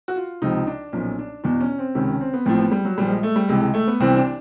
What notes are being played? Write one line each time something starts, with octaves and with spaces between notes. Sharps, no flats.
F#4
F4
C#2 C3 F3 D#4
D4
B1 A#2 F3 C#4
D4
E2 B2 D4
C#4
C4
C#2 C3 D#3 C#4
C#4
C4
B3
A1 A2 F3 C4
B3
G3
F#3
A#1 A#2 F3 G3
G#3
A3
G3
C#2 C3 E3 G#3
G#3
A3
B3
C2 C3 E3 C4
D4